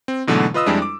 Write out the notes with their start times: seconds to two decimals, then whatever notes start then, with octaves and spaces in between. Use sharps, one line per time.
0.08 C4
0.27 G#2 B2 D3 E3 F#3 A3
0.54 F4 B4 D#5 D#6 E6
0.66 F2 G3 G#3 D4 E4
0.82 D6